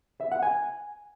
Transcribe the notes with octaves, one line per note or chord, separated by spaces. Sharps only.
E5
F#5
G#5